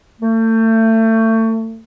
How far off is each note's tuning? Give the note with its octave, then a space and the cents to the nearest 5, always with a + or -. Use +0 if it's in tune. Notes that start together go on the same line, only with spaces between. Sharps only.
A3 +30